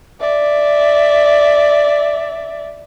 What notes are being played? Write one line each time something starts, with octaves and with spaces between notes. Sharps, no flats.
D5 E5